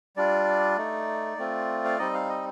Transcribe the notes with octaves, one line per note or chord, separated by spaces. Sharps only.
G3 D4 F4 D5
A3 D#4
A3 C4 F4
F5
G3 C4 D#4 D#5
F5
D#5